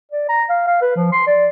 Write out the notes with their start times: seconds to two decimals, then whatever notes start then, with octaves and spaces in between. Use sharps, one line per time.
0.12 D5
0.29 A#5
0.50 F5
0.67 F5
0.82 B4
0.96 F3
1.12 C6
1.27 D5